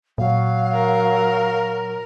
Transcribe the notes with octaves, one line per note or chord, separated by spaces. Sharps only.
A#2 F#3 F5
A#4